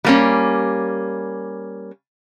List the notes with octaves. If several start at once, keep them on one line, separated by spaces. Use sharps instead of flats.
G3 A#3 C#4